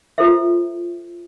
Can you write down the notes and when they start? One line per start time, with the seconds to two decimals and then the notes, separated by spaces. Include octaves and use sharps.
0.18 F4 A4 A#4 C5 E5